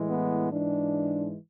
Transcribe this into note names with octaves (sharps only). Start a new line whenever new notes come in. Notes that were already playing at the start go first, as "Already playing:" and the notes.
Already playing: A2 E3 G#3
B3
G#2 E3 G#3 D4